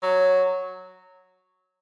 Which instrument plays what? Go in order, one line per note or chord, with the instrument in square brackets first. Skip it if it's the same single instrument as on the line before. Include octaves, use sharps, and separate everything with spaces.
[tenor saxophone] F#3